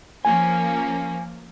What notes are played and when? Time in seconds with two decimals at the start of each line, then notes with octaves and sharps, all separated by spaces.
0.25 F3 A#3 C#4 G#5